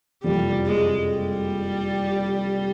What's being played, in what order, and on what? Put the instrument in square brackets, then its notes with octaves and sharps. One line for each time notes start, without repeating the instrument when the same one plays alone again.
[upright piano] F#1 F2 C3 F3 [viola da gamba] G3
[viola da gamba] G#3
G3